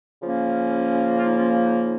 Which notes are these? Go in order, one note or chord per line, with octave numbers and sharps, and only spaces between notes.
C#3 F3 A#3 C#4
F4
D#4
C#4 F4
C#4
D#4
D#4